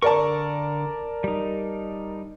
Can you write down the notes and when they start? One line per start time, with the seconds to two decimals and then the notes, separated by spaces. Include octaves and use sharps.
0.02 D3 A#4 D5 A5 C#6
1.24 G3 D#4